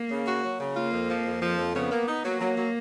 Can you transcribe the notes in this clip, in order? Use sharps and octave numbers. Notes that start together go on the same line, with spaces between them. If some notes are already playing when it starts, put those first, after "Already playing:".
Already playing: A#3
C#3
F#4
F#3
C#3
A#3 F4
F2
F3
F2
F3
F2
C#3 B3
A#3
D#4
F#3 A#3
F#3
F#3